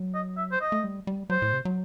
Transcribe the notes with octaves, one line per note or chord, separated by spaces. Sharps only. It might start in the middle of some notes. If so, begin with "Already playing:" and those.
Already playing: F#3
D#5
E5
C5
D#5
A3
G3
G3
F#3 C5
A2
C3
F#3